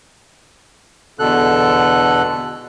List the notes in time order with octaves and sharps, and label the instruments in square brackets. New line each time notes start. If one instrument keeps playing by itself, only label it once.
[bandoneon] E2 B2 D3 A4 F#6